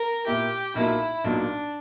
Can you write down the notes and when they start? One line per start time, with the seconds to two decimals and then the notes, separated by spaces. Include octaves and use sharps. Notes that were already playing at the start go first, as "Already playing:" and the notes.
Already playing: A#4
0.26 A#2 A#3 E4 G4
0.75 B1 A#2 F#3 A#3 E4
1.24 B1 A#2 F#3 A#3 D4